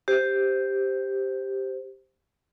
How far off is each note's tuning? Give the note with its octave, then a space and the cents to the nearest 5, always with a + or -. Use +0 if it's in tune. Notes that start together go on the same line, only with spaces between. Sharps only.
G4 +0 C5 +0